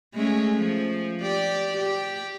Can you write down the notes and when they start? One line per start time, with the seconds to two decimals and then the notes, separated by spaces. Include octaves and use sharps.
0.14 G#3 A3 C#4
0.56 F3
1.22 G4 D5
1.77 G4